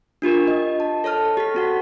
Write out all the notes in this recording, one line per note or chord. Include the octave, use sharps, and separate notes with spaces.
D4 F4 G4 A#4
D#5
A5
A4 C#5 A5 F6
G4 A4 B6
C4 F#4 F#5